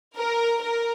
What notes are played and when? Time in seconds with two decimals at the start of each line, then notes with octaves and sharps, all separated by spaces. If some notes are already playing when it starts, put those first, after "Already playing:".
0.17 A#4
0.62 A#4